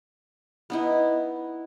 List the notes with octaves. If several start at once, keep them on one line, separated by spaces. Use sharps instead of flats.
B3 D#4 E4